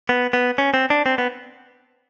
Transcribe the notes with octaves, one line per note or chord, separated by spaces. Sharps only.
B3
B3
C#4
C4
D4
C4
B3